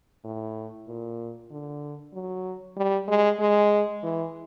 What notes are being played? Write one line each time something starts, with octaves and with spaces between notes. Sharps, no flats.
A2
A#2
D3
F#3
G3
G#3
G#3
E3